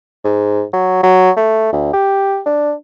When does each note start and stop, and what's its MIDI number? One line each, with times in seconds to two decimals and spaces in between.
0.25 0.63 44
0.73 1.01 54
1.03 1.31 54
1.37 1.70 57
1.73 1.93 38
1.93 2.40 67
2.46 2.73 62